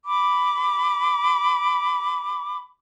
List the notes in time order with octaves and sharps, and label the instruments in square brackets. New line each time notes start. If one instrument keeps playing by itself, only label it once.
[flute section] B5 D6